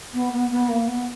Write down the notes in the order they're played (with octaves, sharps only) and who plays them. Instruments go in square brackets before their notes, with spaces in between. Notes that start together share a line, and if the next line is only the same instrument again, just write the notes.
[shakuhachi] B3
B3
B3
A#3
B3